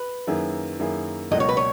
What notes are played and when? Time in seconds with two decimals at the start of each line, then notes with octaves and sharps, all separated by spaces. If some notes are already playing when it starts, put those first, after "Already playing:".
Already playing: B4
0.27 F#2 D#3 A#3 E4 G#4
0.79 F#2 D#3 A#3 E4 G#4
1.31 C#2 B2 F#3 A#3 D#5
1.40 C#5
1.49 B4
1.57 C#5